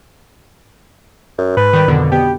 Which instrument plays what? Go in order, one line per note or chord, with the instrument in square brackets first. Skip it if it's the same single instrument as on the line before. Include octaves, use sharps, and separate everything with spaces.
[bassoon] F#2
[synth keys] G#2 [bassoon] B4
[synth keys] D#3 G3
F2 B2 D3
[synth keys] B3 [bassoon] G4